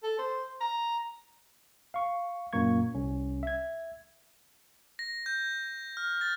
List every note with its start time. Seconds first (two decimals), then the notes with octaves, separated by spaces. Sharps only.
0.03 A4
0.18 C5
0.61 A#5
1.94 F5 C#6
2.53 F#2 A#2 A#3 C#6 G#6
2.95 C2 C#4
3.43 E5 G#6
4.99 A#6
5.26 G6
5.97 F6
6.21 A6